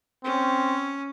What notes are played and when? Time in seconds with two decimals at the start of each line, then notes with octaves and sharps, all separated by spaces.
0.24 C4 C#4